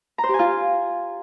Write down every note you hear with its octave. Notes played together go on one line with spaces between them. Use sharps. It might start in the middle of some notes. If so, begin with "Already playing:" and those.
A#5
C5
G4
G#5
F4